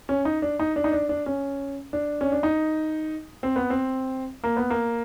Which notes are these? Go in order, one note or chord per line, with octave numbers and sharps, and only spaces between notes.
C#4
D#4
D4
D#4
D4
D#4
D4
D4
C#4
D4
C#4
D4
D#4
C4
B3
C4
A#3
B3
A#3